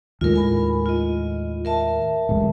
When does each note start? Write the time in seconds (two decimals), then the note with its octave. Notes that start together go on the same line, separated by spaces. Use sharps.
0.21 D#2 A2 G#3 F4 A#4
0.34 A#4 G#5 B5
0.86 F4 D#5
1.65 A#4 E5 A5
2.29 D1 A1 G#3